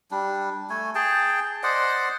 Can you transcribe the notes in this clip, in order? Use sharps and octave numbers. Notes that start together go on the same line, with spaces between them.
G3 D4
A3 G#5
G#4 G5 A5
C5 D5 D#5 F#5